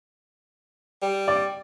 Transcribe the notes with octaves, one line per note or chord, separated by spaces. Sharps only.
G3
D5